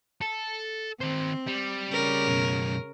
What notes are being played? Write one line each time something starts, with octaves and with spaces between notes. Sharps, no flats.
A4
D#3 C4 C5
G3
C#3 C#4 A#4
F#2 B2